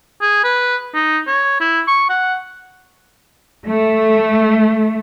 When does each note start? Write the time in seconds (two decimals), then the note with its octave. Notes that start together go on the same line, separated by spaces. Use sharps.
0.22 G#4
0.44 B4
0.94 D#4
1.27 C#5
1.61 E4
1.87 C#6
2.10 F#5
3.66 A3